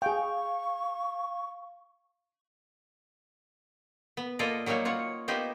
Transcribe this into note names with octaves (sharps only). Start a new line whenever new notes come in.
G#4 F5 G5 C#6
B3
A#3 F4 A4 D5 D#5
F#3 G3 A#3 D#4 C#5
F4 C#5 F#5
A#3 B3 D#4 G4 C5